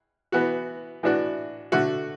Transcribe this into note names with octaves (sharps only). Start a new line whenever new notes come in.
E3 B3 F#4
A2 E3 D4 F#4
D3 A3 F#4